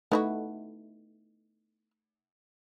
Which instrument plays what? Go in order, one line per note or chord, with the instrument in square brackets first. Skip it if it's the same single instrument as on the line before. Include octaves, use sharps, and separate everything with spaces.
[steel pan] A3 D#4 [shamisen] B3 E4 F#4